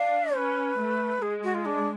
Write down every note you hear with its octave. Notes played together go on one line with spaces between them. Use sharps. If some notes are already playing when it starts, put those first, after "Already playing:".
Already playing: D4 F5
C#4 B4
A3
G#3 G#4
F#4
F4
D4